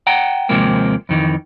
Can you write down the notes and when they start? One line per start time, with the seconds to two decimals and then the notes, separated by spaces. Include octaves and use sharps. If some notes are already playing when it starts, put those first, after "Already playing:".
0.07 F#5 G5 A#5
0.49 D#2 C3 F3 G#3 A#3 C4
1.09 F2 D#3 E3